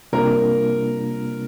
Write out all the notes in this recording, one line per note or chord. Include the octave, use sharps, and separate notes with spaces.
C3 G3 A#3 D4 F4 A#4